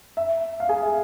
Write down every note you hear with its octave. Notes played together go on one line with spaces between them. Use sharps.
E5
F5
G#4 G#5
E5